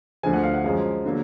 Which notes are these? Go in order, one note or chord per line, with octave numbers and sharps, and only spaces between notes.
D2 D3 F3 G#5
F#5
F5
F#5
F#2 F3 G#3 F5
D3 F#3 A#3